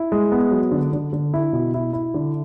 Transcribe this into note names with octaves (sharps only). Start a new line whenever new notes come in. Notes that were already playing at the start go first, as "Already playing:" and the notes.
Already playing: E4
G#3
B3
F#3
D3
D3
D3
E4
B2
E4
E4
D3